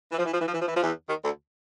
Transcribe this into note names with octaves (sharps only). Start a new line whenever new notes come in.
E3
F3
E3
F3
E3
F3
E3
F3
E3
F3
E2 E3
D#2 D#3
D2 D3